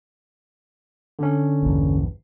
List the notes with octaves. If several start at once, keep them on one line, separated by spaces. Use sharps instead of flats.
D3 C#4
A#1 E2 G2